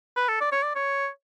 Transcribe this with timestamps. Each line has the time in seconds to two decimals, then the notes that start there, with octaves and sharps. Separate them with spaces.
0.17 B4
0.28 A4
0.41 D5
0.52 C#5
0.63 D5
0.75 C#5